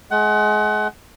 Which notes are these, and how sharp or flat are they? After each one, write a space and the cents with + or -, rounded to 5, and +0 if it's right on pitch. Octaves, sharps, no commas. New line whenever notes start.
G#3 +30 F#5 +25